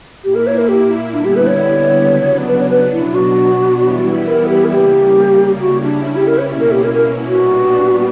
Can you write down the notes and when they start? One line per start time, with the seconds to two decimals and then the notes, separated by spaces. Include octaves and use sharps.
0.24 A#2 A#3 E4 G4
0.35 A#4
0.47 C#5
0.58 A#4
0.68 G4
1.13 D3 G3 B3 D4 E4
1.25 G4
1.36 B4
1.47 C#5
2.03 C#3 F#3 B3 D4
2.47 B4
2.59 C#5
2.70 B4
2.92 B2 F#3 B3 D4 E4
3.14 F#4
3.81 E3 G3 B3 E4
4.26 A#4
4.48 G4
4.65 A#4
4.71 C#3 G3 A#3 G4
5.60 C#3 G3 C#4 E4 F#4
5.82 D4
6.05 D4
6.16 G4
6.27 A#4
6.38 C#5
6.49 B2 A#3 C#4 E4
6.60 A#4
6.71 G4
6.83 A#4
6.94 A#4
7.27 F#4
7.38 A#2 G3 B3 D4